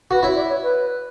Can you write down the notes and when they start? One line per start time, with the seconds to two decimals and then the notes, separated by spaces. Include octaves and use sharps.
0.11 F#4 B4
0.23 E4 C#5
0.36 D5
0.49 C#5
0.62 B4